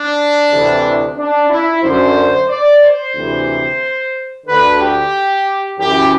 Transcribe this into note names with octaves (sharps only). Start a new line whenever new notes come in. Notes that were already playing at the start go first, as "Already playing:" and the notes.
Already playing: D4
D2 C3 E3
D4
E4
F#2 D3 C5
D5
C5
D2 C3 E3
D2 D3 B4
G4
F#2 E3 G4